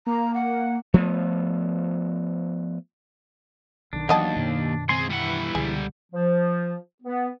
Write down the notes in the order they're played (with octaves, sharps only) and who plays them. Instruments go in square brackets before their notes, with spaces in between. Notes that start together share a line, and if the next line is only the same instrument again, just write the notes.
[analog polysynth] A#3 [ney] A#5
[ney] F#5
[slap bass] F3 A3 B3
[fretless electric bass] B1 D#3 [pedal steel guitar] D4
[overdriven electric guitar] D#2 [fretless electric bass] E3 F#3 [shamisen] B3 D#5 A5
[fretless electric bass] F#2 B2 D#3
[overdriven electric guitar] C#2 G#4 [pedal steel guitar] C4 C6
[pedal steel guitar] E3 E4 [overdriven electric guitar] G3 F#5
[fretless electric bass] C#2 B2 D3 [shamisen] G#4
[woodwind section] F3
B3